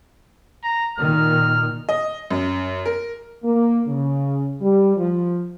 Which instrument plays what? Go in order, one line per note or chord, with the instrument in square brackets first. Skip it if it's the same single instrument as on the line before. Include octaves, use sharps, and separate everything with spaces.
[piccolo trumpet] A#5
[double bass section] A#2 D#3 [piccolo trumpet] F6
[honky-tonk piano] D#5
F#2
A#4
[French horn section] A#3
C#3
G3
F3